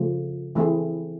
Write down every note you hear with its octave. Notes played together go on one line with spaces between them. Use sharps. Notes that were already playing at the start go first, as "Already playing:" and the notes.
Already playing: C#3 F3 A3
E3 A3 C4 E4 G#4